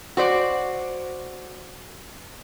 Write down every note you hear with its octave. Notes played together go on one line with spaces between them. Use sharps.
F#4 C5 D5